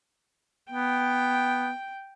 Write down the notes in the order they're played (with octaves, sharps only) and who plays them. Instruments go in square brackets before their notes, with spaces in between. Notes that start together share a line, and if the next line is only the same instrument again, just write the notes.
[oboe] B3 [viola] G5